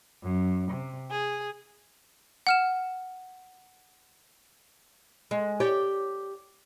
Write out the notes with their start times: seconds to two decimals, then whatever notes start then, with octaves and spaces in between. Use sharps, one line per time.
0.24 F#2
0.73 C3
1.11 G#4
2.47 F#5 F6 E7
5.31 G#3
5.60 G4 C#5 D5